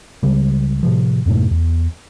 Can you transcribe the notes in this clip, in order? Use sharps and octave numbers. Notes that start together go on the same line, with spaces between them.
C#2 C#3 G3
A2 C3 F3
F2 G#2 B2 A3
E2